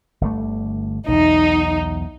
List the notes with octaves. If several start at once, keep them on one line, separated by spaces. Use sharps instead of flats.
G1 D3 A3
B1 E2 D#4